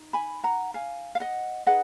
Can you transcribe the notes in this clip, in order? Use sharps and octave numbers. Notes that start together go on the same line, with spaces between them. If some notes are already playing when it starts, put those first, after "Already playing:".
Already playing: D#4
G#5 B5
F#5 A#5
F5 G#5
F5
D#5 F#5
D#4 G#4 B4 D#5 F#5